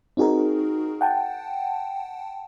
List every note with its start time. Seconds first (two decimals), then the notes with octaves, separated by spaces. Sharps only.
0.17 C4 D#4 F#4 G#4 A#4
1.01 F#5 G5 A5